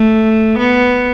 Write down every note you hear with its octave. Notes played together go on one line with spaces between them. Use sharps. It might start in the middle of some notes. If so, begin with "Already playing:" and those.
Already playing: A3
B3